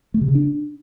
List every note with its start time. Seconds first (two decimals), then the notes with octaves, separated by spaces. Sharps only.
0.14 A3
0.21 C3
0.28 C#3
0.35 D4